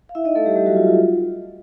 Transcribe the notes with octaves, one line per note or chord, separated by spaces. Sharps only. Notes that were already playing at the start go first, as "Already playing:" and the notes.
F5
E4 E5
D#4 D#5
A3 A4
G3 G4
G3 G4
F#3 F#4
F4
F4